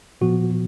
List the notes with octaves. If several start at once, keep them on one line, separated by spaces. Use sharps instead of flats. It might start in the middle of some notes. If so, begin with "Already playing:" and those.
A#2 F3 B3 F#4